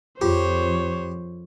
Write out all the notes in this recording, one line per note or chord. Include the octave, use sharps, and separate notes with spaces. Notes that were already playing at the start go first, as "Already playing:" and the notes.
F2 F4 G4 G#4 C5 C#5